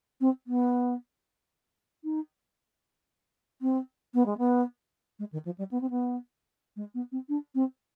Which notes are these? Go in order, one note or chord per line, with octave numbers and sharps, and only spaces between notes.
C4
B3
D#4
C4
B3
G#3
B3
G#3
D#3
F3
G3
B3
C4
B3
G#3
B3
C4
D4
C4